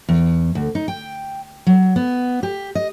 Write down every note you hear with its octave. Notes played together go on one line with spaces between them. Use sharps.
E2
D2
D#4
G5
F#3
B3
G4
D#5